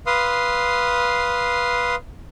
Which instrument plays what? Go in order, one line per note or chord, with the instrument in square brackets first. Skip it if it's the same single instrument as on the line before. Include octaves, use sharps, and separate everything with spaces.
[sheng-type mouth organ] B4 F5 C6 D#6